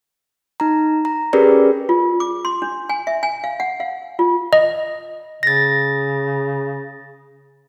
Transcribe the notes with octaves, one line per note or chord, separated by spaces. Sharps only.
D#4 A#5
A#5
C#4 G4 G#4 A#4 B4 D5
F4
D6
C6
D4
G#5
E5
G#5
F5
F#5
F5
F4
D#5
C#3 A6 A#6